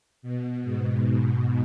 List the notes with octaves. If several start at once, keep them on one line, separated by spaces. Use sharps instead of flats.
B2
G#2